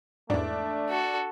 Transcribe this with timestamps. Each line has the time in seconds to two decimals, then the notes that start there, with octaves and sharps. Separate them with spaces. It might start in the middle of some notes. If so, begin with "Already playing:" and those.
0.30 E2 G#2 A3 D4
0.90 F#4 A4